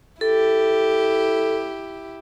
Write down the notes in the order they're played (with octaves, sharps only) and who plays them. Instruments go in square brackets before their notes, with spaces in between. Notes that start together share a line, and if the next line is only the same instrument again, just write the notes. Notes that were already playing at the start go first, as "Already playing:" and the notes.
[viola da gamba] E4 G4 [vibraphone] A4